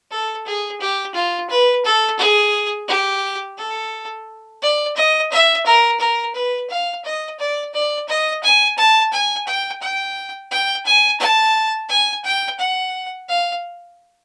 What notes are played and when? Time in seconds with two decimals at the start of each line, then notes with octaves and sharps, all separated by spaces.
0.11 A4
0.46 G#4
0.81 G4
1.15 F4
1.50 B4
1.85 A4
2.19 G#4
2.88 G4
3.58 A4
4.62 D5
4.96 D#5
5.31 E5
5.66 A#4
6.00 A#4
6.35 B4
6.70 F5
7.04 D#5
7.39 D5
7.74 D5
8.08 D#5
8.43 G#5
8.78 A5
9.12 G#5
9.47 G5
9.82 G5
10.51 G5
10.85 G#5
11.20 A5
11.89 G#5
12.24 G5
12.59 F#5
13.29 F5